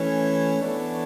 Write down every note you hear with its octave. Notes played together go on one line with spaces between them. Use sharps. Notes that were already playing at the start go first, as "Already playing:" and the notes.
Already playing: E3 A3 C#4
E3 B3 D4 A4 C#5